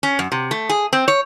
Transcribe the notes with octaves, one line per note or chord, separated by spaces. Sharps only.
C#4
F#2
C3
A3
G#4
C4
C#5